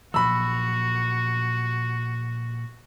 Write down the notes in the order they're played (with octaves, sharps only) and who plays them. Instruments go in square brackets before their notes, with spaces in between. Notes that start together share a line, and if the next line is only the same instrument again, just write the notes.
[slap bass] A#2 F3 F#3 [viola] F#4 [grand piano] B5 E6